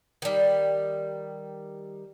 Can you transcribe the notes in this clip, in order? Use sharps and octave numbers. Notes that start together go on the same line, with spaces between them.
D#3 G3